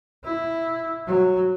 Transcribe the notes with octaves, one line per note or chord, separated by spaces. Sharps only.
E4
F#3